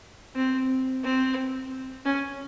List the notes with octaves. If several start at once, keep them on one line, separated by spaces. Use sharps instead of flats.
C4
C4
C#4